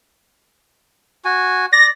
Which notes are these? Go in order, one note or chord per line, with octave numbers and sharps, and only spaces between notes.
F#4 G#5
D5 A#6